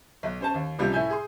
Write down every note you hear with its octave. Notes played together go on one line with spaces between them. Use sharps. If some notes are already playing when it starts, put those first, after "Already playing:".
B1
C#4 C5 A5
D#2
C#2 C3 F3 G3
A2 E5 G#5 G6
G#4 C6